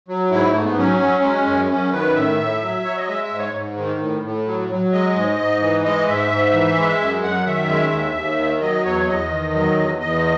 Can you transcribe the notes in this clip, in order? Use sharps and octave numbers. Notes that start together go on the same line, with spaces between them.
F#3
G#2 E4
G#2 A3
B3
F#3 C#4
F#3
G#3
F#2
F#2 C#4
D#3 B4
A2 E5
A2
F#3
F#3 C#5
D#5
G#3 E5
E5
G#2
C#5
G#2
D#3
A2
A2
F#3
F#3
G#3 D#5
G#2
G#2
E3
G#3 D#5
G#2 E5
G#2
E3
G#3
F#2
F#2 F#5
D#3 E5
G#3
D#2
D#2
D#3
F#3 D#5
E2 C#5
E2 D#5
D#3
F#3
E2
E2 D#5